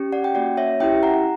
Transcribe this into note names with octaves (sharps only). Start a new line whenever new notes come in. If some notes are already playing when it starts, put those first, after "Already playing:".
Already playing: C#4 G4
D5 F#5
G5
A#3 C#4 F#4 D5 F#5
C#5 E5
C#4 E4 G4 E5 G5
F#5 A#5